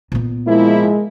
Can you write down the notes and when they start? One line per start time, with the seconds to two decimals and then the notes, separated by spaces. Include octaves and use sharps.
0.12 A#2 B3
0.47 F3 G#3 A#3 E4